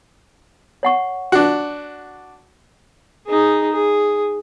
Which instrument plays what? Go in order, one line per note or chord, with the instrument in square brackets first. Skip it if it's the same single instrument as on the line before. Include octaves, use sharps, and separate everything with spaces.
[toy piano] C#5 F#5 C#6
[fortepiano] D4 F#4
[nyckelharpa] D#4 G#4
G#4